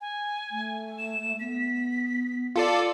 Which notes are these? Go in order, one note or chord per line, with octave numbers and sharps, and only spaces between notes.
G#5
A3
E7
B3 B6
F4 A4 D5 C#7